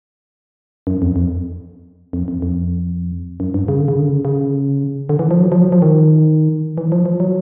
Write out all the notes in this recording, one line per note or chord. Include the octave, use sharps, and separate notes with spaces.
F#2
F2
F2
F2
F2
F2
F#2
G2
C#3
D3
C#3
D3
C#3
C#3
D3
E3
F3
F#3
F3
F#3
F3
D#3
E3
F3
F3
F#3